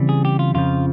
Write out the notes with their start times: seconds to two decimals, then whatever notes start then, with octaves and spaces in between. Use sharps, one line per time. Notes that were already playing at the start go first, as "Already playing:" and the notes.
Already playing: C#3 E3 G3 C4
0.09 G#4
0.25 G4
0.39 F4
0.54 F2 C#3 F3 F4